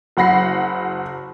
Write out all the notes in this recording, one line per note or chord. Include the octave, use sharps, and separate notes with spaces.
F#1 F#3 F#5 B5 A#6 C7